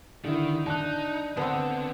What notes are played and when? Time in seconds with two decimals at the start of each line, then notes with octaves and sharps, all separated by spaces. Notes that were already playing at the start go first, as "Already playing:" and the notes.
0.24 D3 D#3 E4
0.66 D4 D#4 A5 F#6
1.37 D3 B3 C4 F#5 A5